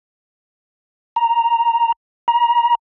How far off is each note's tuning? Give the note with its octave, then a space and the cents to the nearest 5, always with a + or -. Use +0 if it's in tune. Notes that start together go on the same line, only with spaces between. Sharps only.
A#5 +0
A#5 +30